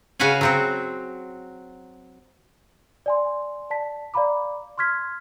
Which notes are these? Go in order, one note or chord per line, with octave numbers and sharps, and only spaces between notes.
C#3 F#4 B4 F5 F#5 G#5
F#3 C4 F#4
D5 G#5 C6
D5 A5 B6
D5 F5 A#5 B5 D6
C6 C#6 F6 G#6 B6